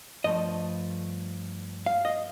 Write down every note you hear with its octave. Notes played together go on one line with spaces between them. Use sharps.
G2 F3 A3 D#5
F5
D#5